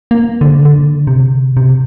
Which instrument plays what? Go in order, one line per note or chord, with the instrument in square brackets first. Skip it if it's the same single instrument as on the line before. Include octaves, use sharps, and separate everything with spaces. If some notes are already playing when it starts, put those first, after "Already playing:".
[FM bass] A#3
D3
D3
C3
C3